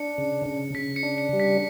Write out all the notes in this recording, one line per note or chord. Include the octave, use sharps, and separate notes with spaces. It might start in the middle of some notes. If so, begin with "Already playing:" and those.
Already playing: D4 C#7
C#3
C#3
C#3 B6
C#7
D4
C#7
G3
B6